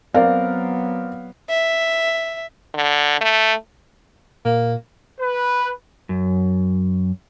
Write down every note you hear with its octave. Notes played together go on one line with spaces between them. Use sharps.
F#3 B3 C4 A#4 D5 F5
E5
D3
A3
A#2 A#3
B4
F#2